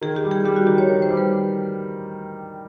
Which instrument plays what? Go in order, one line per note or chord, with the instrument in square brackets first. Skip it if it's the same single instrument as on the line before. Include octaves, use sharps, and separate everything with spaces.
[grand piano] D#3 [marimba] G#4
[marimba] G4
[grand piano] G3
[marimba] G#4
[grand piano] G3 [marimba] G4
[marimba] F#4
[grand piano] D#3 [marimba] G4
[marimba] C#5
[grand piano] D#3 [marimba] C#5
[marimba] C5
[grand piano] G3
[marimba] B4